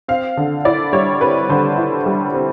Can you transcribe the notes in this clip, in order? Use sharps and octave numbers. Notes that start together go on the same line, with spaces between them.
C4 F5
D3
E4 D5
G3 C#5
C4 B4
D3 C5
E4
G3
C4